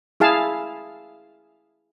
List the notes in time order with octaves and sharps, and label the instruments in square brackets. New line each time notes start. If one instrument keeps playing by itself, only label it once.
[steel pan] E4 G#4 F5 A5